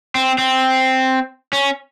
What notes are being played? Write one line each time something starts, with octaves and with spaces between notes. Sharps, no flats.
C4
C4
C#4